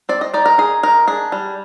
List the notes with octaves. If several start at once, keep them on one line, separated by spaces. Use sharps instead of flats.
C4 D5
D#5
D#4 D5
A#4
D#4 G#4
D#4 A#4
D4 G#4
G3